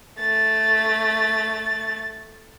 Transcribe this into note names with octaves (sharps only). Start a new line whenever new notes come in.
A3 A6